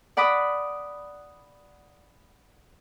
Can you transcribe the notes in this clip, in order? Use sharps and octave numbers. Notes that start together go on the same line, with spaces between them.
D5 F#5 B5 D6 D#6